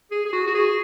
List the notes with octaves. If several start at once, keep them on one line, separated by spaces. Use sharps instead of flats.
G#4
G#4
F#4
F#4
G#4